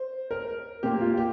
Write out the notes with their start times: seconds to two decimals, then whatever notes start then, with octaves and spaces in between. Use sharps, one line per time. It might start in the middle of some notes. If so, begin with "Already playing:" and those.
Already playing: C5
0.31 A#4
0.83 A#2 A#3 G4
1.01 F4
1.17 G4